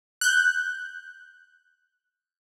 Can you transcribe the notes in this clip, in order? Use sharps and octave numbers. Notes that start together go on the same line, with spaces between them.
F#6 G6